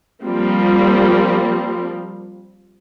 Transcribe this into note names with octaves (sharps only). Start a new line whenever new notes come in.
F3 G3 A#3 C4